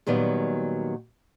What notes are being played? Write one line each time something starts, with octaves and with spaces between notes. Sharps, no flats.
A#2 D#3 F#3 G3 B3